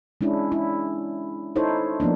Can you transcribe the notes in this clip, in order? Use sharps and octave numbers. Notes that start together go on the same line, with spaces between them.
G#3 C#4 D4 E4
E4
D#4 E4 A4 C5 C#5
F3 A#3 B3 D4